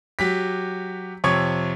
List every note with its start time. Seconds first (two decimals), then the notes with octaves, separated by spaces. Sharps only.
0.19 F#3 G4 B6
1.24 F2 C3 C#5 C#6 G#6